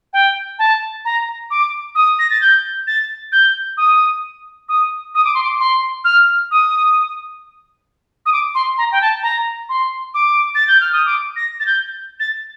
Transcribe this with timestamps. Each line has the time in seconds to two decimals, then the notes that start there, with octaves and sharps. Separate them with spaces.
0.13 G5
0.59 A5
1.05 A#5
1.51 D6
1.95 D#6
2.19 A#6
2.30 A6
2.41 G6
2.87 A6
3.32 G6
3.77 D#6
4.69 D#6
5.15 D#6
5.24 D6
5.34 C6
5.43 D6
5.60 C6
6.04 F6
6.51 D#6
8.26 D#6
8.33 D6
8.55 C6
8.78 A#5
8.92 G5
9.01 A5
9.23 A#5
9.69 C6
10.14 D6
10.55 A6
10.68 G6
10.81 F6
10.93 D#6
11.06 D6
11.36 A#6
11.60 A6
11.66 G6
12.20 A6